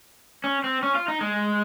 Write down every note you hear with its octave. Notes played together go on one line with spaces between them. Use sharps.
C#4
C4
C#4
F4
D#4
G#3